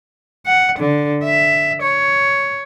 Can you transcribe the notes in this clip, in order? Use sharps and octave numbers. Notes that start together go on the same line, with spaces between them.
F#5
D3
E5
C#5